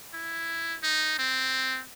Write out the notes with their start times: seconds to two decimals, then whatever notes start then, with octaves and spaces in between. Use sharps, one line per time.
0.14 E4
0.83 D#4
1.19 C4